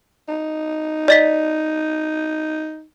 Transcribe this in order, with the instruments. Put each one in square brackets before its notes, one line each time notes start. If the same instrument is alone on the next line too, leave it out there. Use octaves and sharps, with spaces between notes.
[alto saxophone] D#4
[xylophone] D5 D#5 B6